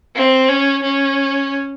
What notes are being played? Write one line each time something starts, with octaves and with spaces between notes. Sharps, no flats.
C4
C#4
C#4